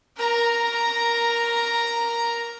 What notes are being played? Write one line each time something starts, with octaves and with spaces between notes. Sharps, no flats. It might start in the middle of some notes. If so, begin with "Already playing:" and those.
A#4 A#5